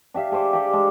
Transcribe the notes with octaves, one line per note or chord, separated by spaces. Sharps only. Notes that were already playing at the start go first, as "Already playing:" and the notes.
D4 G4 E5 F5
G#4 A4 C5 D6
G4 A4 D5 F5
G#3 A4